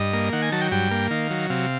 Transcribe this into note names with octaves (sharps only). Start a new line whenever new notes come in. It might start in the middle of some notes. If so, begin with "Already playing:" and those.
Already playing: G2 D#5
A#3
D#3 F#5
G#5
F#3 A5
G5
G2 G5
A#3
D#3 F5
F#3
C3 F5